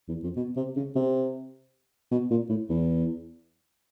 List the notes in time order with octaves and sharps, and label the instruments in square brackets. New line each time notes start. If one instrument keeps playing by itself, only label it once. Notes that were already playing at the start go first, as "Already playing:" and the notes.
[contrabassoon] E2
F2
B2
C3
C#3
C3
B2
A#2
A2
E2